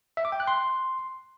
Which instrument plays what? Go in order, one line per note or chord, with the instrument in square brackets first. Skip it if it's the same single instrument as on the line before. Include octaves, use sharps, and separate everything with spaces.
[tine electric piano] E5
D6
G5
F#6
C6